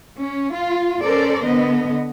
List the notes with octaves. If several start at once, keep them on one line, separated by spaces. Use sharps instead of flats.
C#4
F4
C#4 A4 A#4 C5 D5
D3 B3 D#5